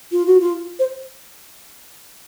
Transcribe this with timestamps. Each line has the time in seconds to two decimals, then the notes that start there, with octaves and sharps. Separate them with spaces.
0.12 F4
0.26 F#4
0.41 F4
0.79 C5